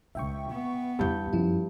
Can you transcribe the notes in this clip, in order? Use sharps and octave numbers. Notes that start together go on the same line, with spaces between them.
C#2 F4 E5 G5 C#6
B3
E2 G2 D#4 G6
F#2 F3 E4